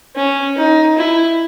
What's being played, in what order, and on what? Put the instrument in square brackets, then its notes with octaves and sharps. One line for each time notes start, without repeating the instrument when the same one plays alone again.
[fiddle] C#4
D#4
E4